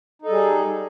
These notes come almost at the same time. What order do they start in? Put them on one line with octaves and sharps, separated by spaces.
D#4 A4 G3 G#4